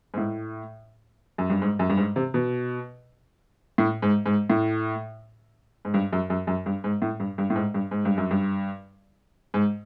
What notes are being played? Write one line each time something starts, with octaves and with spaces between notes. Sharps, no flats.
G#2
A2
F#2
G2
G#2
F#2
G2
G#2
C3
B2
A2
G#2
G#2
A2
G#2
G2
F#2
F#2
F#2
G2
G#2
A2
G2
G2
A2
G#2
G2
G#2
G2
F#2
G2
G#2